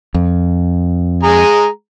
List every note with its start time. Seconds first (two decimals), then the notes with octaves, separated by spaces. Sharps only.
0.14 F2
1.23 G#3 G#4 A#5